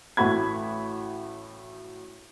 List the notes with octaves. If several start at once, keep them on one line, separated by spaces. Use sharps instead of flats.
A1 A3 F#4 B5 G#6